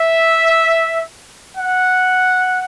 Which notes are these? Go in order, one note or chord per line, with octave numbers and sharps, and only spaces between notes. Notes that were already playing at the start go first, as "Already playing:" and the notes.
Already playing: E5
F#5